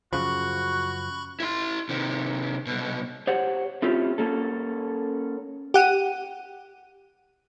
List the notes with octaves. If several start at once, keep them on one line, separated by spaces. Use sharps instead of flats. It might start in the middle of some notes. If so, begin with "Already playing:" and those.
F#2 C#3 F3 F#4 B5 C#6 F#6
E4 C6
C3 D#3
C2 B2
G4 C5 C#5 F#5
A3 C4 C#4 E4 F4 G4
A#3 C#4 A4
G4 F#5 D#7